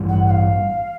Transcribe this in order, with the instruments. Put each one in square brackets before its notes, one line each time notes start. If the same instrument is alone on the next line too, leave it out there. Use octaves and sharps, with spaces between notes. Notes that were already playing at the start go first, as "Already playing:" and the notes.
Already playing: [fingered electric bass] A1 G2 E3 G3
[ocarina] F#5
F#5
F5